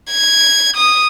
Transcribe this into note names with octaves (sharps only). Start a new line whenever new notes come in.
G#6
D#6